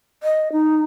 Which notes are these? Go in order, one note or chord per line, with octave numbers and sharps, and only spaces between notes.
D#5
D#4